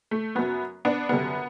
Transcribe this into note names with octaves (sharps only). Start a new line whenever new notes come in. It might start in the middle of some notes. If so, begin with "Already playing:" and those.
A3
F#2 F#3 B3
B3 D4
F#2 D3 G3 B3